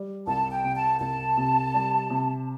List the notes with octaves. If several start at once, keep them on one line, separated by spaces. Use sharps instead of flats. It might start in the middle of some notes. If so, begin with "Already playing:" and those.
Already playing: G3
C2 A5
G5
C3
A5
C2 A5
C3
G3
C3